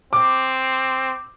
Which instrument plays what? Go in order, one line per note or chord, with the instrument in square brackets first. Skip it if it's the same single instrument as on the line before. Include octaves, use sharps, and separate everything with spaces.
[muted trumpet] C4 [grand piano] D6